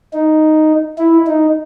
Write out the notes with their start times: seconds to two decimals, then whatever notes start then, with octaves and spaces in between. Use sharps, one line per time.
0.13 D#4
0.98 E4
1.27 D#4